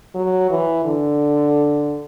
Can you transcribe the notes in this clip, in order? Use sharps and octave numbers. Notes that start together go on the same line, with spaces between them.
F#3
E3
D3